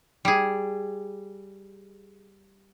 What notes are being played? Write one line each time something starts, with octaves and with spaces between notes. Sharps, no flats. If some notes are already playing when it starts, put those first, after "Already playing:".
G3 G#4